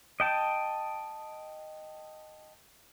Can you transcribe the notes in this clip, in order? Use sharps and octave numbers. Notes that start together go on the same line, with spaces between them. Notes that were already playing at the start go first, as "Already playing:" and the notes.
D#5 G5 A5